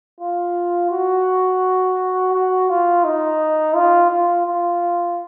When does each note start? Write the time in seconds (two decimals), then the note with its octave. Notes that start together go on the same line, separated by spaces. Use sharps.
0.21 F4
0.91 F#4
2.33 F#4
2.69 F4
3.04 D#4
3.75 F4
4.11 F4
4.46 F4